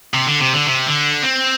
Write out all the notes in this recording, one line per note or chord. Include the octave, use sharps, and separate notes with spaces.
C3
D3
C3
D3
C3
D3
C4